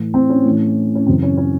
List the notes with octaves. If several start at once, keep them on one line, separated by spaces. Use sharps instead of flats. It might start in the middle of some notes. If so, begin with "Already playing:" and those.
Already playing: A2 E3
C4
C#4
A2 E3
C#4
F#2 C#3 E3 C4
C#4
C#4